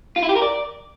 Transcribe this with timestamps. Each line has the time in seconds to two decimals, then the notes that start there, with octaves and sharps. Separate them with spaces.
0.16 F4
0.23 E4
0.29 G4
0.35 A#4
0.42 D5